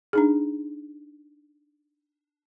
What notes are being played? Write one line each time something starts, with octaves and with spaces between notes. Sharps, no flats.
D4 D#4 G#4